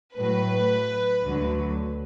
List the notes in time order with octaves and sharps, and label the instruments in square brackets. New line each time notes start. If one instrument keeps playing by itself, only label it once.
[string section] A2 F#3 B4
D2 D3 F#3